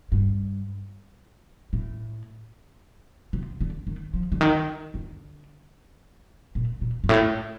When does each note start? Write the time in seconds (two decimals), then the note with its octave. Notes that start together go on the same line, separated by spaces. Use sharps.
0.12 G2
1.73 A2
3.33 C3
3.61 D3
3.87 D#3
4.14 F3
4.32 D3
4.41 D#3
4.94 D3
6.55 A#2
6.81 A#2
7.04 G2
7.09 A2